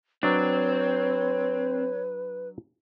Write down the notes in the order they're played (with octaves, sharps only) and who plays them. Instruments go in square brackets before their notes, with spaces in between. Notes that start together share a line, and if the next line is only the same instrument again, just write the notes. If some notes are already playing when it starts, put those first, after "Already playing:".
[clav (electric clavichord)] F#3 D4 [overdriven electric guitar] C4 [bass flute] B4 [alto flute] C#5